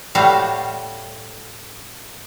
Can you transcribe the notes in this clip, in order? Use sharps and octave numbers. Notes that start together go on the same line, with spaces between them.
A2 G3 A3 F#4 C5 F5